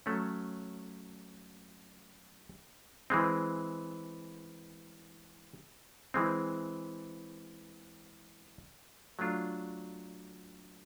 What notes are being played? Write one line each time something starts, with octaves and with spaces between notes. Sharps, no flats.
F#3 A3 C#4
E3 G#3 C4
E3 G#3 C4
F#3 A3 D4 F4